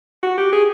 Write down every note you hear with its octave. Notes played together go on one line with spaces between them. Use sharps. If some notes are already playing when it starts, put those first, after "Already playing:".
F#4
G4
G#4